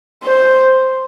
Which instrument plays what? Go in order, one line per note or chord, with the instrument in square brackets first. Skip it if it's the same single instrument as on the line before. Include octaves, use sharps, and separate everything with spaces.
[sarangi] C5